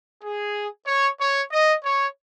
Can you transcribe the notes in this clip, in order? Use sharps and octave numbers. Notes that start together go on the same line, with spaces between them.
G#4
C#5
C#5
D#5
C#5